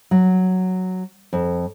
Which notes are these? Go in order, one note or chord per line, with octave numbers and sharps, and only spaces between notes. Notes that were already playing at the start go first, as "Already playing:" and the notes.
F#3
F2